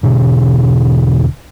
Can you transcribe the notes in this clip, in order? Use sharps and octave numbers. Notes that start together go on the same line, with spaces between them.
E1 B2 D3